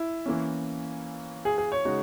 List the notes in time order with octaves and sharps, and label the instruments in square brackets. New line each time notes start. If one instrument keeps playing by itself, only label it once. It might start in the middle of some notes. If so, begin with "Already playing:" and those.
Already playing: [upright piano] E4
[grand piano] E3 A#3 C#4
[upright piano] G#4
G#4
C#5
[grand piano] C#3 G#3 D#4 F#4